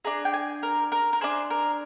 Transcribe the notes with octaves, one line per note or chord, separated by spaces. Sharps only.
D4 G#4 A#5
G5
G#5
A#4
A#4
A#4
D4 G#4 C5
A#4